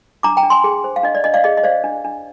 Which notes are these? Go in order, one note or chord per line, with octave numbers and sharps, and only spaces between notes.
D4 A#5 D6
G5 A#5
D4
G#5 C6
G#4
C5
F5
D4 D#5
D5
D4 D#5
D5 F5
G#4 D#5
D#5
C5 D5 F5
D4
D4